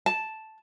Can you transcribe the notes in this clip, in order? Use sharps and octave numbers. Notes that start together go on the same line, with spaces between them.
A5